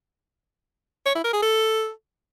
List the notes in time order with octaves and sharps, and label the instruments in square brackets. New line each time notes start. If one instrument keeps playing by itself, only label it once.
[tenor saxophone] C#5
E4
A#4
G#4
A4